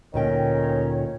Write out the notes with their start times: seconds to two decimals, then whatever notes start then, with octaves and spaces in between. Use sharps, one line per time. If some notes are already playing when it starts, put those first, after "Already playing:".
0.14 D2 A#2 D#3 C#4 D#4 C#5 G5